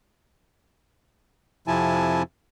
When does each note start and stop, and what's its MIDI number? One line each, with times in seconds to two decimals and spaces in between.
1.67 2.23 41
1.67 2.23 48
1.67 2.23 53
1.67 2.23 64
1.67 2.23 80
1.67 2.23 81